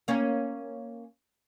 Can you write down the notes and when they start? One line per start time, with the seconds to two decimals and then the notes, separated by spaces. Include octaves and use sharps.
0.08 A#3 C#4